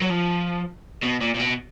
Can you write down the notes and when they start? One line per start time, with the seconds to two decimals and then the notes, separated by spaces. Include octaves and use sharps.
0.01 F#3
0.09 F3
1.03 B2
1.21 A#2
1.34 A#2
1.39 B2